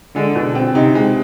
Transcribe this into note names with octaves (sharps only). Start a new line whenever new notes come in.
D3 G#3
B2
C4
C3 D#4
G#3